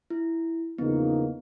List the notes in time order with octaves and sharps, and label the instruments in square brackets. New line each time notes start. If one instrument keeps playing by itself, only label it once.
[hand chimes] E4
[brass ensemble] E2 C#3 F3 A#3 D#4 [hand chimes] B3